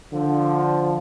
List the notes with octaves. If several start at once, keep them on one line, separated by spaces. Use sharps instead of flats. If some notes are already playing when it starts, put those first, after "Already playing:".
D3 F3